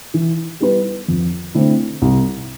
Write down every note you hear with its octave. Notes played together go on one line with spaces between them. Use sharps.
E3
G3 B3 E4 B4
F2
D3 A3 C4 E4
C2